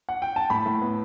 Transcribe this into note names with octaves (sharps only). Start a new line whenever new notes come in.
F#5
G5
A5
A2 B5
A2
B3